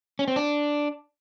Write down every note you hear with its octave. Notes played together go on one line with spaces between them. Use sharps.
C#4
C4
D4